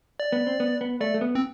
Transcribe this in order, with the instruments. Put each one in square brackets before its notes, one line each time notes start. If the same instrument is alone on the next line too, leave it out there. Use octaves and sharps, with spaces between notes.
[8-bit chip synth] D5
[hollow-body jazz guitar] B3
C4
B3
B3
[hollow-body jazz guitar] A3 [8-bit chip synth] D5
[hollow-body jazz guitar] A3
B3
[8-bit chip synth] C4